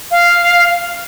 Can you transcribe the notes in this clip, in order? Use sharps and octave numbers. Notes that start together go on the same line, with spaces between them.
F5